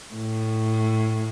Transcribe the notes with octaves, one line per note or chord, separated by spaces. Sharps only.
A2